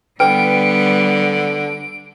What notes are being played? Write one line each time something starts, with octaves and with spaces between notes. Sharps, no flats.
D3 G3 B3 B4 G5 D7